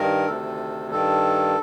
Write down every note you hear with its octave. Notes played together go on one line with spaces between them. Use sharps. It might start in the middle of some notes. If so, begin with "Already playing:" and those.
Already playing: G2 D#3 A#4
D2 C3 D#3 A4
G2 D#3 A4